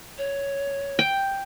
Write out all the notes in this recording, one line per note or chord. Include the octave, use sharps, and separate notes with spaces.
C#5
G5